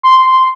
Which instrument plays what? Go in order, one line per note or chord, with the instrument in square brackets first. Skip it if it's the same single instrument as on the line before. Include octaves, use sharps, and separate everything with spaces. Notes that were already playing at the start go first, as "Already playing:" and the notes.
[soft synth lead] C6